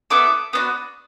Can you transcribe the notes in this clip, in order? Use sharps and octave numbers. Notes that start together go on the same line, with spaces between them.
B3 E4 A4 D6
B3 D4 F#4